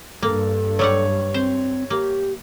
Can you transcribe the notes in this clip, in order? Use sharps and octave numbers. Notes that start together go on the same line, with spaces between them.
G2 A#3 A4
F#3 G3 C#5 F#5
C4 C5
A#3 G4